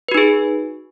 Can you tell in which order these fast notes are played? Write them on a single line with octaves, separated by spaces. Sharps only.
B4 F#4 D#4 G#4